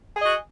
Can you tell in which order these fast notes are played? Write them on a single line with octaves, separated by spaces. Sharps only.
G#4 D#5 F#4